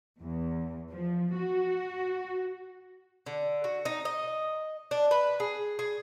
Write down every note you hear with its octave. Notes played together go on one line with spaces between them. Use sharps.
E2
F3
F#4
D3
F#4
D#4
D#5
D4
B4
G#4
G#4